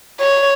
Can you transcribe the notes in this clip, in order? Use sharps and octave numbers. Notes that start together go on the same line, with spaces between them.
C#5